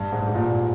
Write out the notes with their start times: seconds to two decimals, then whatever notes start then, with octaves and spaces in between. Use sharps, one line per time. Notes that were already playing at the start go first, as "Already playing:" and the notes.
Already playing: G2
0.12 G#2
0.20 G2
0.28 G#2
0.35 A#2